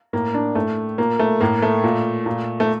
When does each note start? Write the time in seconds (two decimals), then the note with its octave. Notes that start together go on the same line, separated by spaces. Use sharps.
0.13 A2 A#3
0.34 D4
0.55 A2 A3
0.98 A#2 A#3
1.19 A3
1.41 A2 A#3
1.62 A3
1.84 A#2
2.26 A#2
2.60 A3